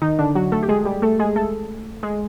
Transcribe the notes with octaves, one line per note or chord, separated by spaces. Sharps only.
D#3 D#4
D3 D4
F#3 F#4
A3 A4
G4
G#3 G#4
G3 G4
A3 A4
G#3 G#4
A3 A4
G#3 G#4